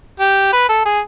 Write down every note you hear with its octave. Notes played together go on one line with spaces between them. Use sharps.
G4
B4
A4
G#4